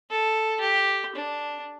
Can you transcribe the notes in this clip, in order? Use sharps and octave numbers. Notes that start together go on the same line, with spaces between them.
A4
G4
D4